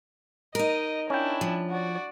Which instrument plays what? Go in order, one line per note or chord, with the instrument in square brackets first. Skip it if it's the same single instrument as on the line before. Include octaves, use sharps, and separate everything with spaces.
[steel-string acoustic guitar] D#4 A#4 [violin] D#5
[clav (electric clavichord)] C#4 G5 [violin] D4 E4
[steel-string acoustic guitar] F3
[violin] F#4 D5